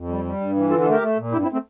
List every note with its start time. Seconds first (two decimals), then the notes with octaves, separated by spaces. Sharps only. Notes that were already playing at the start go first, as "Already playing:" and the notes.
Already playing: F2
0.09 G3
0.25 G3
0.40 G2
0.55 E3
0.70 D3 F4 A4
0.81 F4 A4
0.86 A3
0.91 G4 A#4
1.01 A3
1.17 A#2
1.32 G2 E4 G4
1.42 C4 E4
1.52 A3 C4